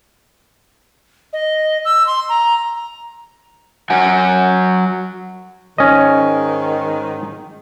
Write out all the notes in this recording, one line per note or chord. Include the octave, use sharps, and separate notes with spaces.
D#5
E6
C6
A#5
F#3 F#5 G#5
G#2 D#3 C#4 D#5